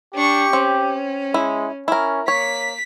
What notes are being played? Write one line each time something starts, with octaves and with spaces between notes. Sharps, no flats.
D4 G4 C#6
C4 C#4
G#3 E4
C#4 E4 A#4
A#3 C#5 B6